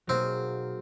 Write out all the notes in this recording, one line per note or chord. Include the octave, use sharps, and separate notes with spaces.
B2 F#3 A#3 C4 D#4 G#4